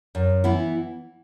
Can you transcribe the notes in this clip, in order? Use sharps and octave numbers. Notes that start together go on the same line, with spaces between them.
F#2
E3 B3 E4